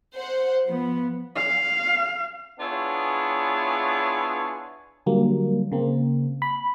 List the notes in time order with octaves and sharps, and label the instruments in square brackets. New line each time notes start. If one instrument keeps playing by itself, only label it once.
[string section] C5 F#5
F3 B3
[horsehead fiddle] F5
[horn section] B3 D4 E4 F4 G#4 C#5
[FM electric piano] D3 F#3 G3 A#3
C#3 A#3 C4
B5